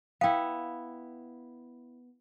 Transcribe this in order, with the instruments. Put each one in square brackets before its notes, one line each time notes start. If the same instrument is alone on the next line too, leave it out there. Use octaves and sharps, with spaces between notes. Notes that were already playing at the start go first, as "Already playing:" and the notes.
[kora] B3 E4 [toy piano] F5 G5